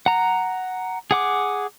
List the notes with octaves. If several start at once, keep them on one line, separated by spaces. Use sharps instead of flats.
F#5 A#5
G#4 F#5 D6